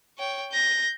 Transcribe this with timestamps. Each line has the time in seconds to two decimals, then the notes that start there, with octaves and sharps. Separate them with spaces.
0.18 C#5 G5
0.52 G6 A#6